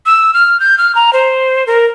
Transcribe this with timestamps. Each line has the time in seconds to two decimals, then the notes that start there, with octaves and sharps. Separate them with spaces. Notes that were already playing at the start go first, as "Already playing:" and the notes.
0.06 E6
0.34 F6
0.60 G6
0.78 F6
0.95 A#5
1.13 C5
1.67 A#4